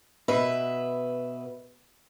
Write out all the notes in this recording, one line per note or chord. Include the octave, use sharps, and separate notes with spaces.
B2 B4 E5